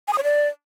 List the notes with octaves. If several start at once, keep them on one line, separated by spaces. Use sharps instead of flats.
G#5
D#6
C#5
D5